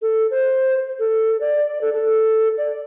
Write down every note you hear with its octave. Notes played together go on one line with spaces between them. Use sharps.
A4
C5
A4
D5
A4
A4
D5